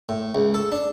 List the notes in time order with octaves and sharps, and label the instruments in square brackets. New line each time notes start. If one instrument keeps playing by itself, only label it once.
[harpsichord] A2
C#2
A4
D4